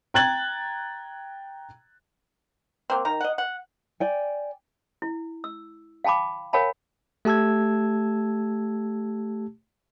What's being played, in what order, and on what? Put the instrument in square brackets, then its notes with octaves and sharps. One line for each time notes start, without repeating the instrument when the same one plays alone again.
[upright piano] G5 A#5 F#6 G#6 A6 F#7
[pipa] F#3 A#3 C4
D#3 A#5
D#5 F#5
F#5
[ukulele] D5 G5 G#5
[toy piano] E4
E6
F5 G5 A5 B5 D6
A#4 C#5 F5 G5 A5 B5
[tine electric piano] A3 G4 A5 E6 G#6